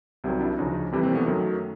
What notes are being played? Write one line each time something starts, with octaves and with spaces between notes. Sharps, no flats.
C2 C3 D#3 F#3
D4 E4
D2 C#3 F3 C#4 D#4
F2 C3 E3 G3
A#3 C4
A3 B3
F#2 D#3 F#3 A3